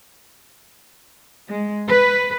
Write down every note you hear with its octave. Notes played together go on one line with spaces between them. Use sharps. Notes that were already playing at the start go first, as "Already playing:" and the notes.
G#3
B4